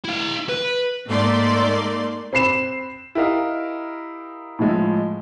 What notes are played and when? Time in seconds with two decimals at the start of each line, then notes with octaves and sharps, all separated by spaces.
0.04 E4 F5
0.49 B4
1.09 G#2 A3 A#3 D5 C6
2.33 C4 B5 C7 E7
3.15 E4 G4 A#4 D#5 F5
4.59 A2 F3 G#3 E4